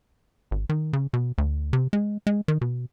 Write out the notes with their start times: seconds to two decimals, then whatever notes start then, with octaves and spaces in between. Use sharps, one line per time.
0.51 G#1
0.69 D#3
0.93 C#3
1.13 B2
1.38 D2
1.73 C3
1.93 G#3
2.27 G#3
2.48 D#3
2.61 B2